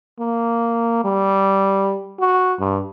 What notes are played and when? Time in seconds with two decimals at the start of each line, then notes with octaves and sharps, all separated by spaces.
0.20 A#3
1.04 G3
2.20 F#4
2.60 G2